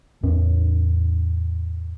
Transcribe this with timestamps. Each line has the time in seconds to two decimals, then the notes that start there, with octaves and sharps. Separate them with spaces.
0.23 E2 A2 C#4